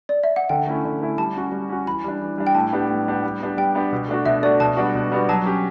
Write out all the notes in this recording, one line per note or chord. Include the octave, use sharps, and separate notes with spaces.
D5
E5
F#5
D3 G5
A3 C#4 E4
D3
A3 C#4 E4
G3 A5
C#4 F#4
G3
C#4 F#4
E3 B5
G3 D4
E3
G3 D4
G5
A2 A5
G3 B3 D4 G4
A2
G3 B3 D4 G4
G3
B3 D4 G4
G3 G5
B3 D4 G4
B2
A3 D4 F#4
B2 E5
A3 D4 F#4 D5
B2 A5
G3 B3 D4 F#4
B2
G3 B3 D4 F#4
F#3 A5
C#4 G4